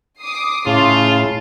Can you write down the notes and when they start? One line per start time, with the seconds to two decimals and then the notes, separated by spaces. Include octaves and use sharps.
0.20 D6 D#6 C7
0.66 A2 C#3 E4 F4 A5 C6